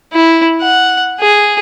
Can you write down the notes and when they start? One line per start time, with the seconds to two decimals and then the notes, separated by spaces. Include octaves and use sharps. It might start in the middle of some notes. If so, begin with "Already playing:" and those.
0.13 E4
0.61 F#5
1.20 G#4